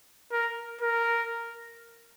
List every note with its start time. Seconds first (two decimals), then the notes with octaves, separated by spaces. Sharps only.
0.32 A#4
0.81 A#4